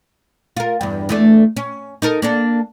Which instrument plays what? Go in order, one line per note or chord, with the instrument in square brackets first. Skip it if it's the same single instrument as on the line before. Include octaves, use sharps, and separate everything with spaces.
[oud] F4 A#4
E2 G2
E2 A3 D4
C#4
D#4 A4 A#4
A#3 D4 A4